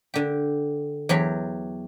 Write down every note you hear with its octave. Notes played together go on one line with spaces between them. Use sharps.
D3 G4
E2 F#3 G4